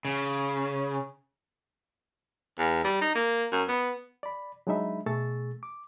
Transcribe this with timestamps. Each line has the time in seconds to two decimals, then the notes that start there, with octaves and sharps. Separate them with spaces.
0.05 C#3
2.58 E2
2.84 G3
3.01 D#4
3.15 A#3
3.52 F#2
3.68 B3
4.23 D5 B5
4.67 F#3 G#3 D4 D#4 E5 B5
5.06 B2 A3 G#4 C#6 E6 A6
5.63 D6